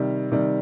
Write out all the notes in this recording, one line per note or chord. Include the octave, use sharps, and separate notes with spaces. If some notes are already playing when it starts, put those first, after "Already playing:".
Already playing: C3 D#3 G3
C3 D#3 G3